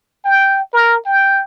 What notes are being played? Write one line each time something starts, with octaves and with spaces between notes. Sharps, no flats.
G5
A#4
G5